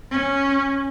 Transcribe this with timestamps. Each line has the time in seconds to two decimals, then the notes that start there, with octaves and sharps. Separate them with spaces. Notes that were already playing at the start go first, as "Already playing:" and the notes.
0.11 C#4